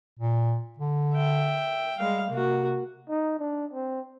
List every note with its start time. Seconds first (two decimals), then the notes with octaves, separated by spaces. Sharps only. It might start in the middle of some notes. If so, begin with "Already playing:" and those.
0.19 A#2
0.79 D3
1.14 E5 G5
1.99 G3 G#3 F5
2.30 C3 A#3 F#4
3.09 D#4
3.39 D4
3.73 C4